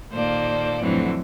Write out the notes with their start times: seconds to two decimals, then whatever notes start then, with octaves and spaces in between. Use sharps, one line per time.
0.11 A#2 D#3 A#3 A4 C5 D5
0.81 F2 A2 D3 E3 F#3 C4